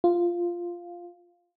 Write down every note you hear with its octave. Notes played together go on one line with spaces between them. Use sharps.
F4